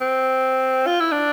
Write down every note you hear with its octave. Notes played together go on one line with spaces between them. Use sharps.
C4
F4
E4
D4